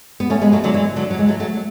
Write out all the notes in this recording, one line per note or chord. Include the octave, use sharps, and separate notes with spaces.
B3
A3 C#4
G#3 B3
F#3 A3
D3 F#3
E3 G#3
D3 F#3
F#3
E3 G#3
F#3 A3
F#3 A3